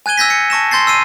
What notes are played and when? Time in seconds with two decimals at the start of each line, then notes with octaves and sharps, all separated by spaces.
0.06 G#5 F#6 G#6 D#7 G7
0.17 E6 G6 A#6 B6
0.30 C#7
0.50 A5 C#6 A#6 E7
0.71 C6 G6 A6 C7
0.87 E6 C7 D#7